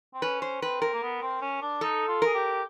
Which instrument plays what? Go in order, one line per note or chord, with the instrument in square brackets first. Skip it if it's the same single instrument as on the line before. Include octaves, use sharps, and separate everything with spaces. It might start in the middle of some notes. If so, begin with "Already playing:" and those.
[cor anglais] C4
[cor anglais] C#4 [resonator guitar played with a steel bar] B4
[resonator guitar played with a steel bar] C5
[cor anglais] C4 [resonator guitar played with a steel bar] B4
[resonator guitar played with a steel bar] A#4
[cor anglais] A#3
B3
C4
C#4
D4
[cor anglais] D#4 [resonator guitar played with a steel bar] A4
[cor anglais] F4
[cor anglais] G#4 [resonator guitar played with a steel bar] A#4
[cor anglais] G4